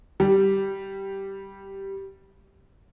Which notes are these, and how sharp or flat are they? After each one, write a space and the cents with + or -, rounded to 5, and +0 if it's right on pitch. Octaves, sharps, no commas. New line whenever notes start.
G3 -5